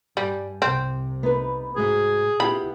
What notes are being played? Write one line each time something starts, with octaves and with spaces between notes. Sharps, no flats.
G2 G3 G#5
C2 C3 C4
B3 D#4 B4
G#2 G#3 F#4 G#4
B3 E4 F4 G4 B5